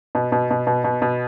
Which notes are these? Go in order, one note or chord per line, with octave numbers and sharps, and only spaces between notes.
B2
B2
B2
B2
B2
B2